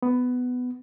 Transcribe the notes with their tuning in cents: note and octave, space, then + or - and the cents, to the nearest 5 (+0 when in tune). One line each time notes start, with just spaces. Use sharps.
B3 +15